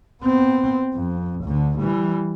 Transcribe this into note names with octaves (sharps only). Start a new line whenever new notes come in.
B3 C4
F2
D2 D3
E3 G3